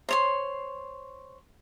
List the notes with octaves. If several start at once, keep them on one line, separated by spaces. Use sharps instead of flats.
C5 C#5 C6